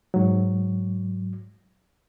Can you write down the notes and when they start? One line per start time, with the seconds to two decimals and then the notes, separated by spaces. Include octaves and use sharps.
0.14 G#2 F#3